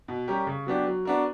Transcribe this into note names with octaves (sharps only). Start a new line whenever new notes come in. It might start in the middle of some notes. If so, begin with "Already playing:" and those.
B2
G3 C#4 G4 A#4
C#3
F#3 B3 D4 G4
F#3
B3 D4 F#4 A#4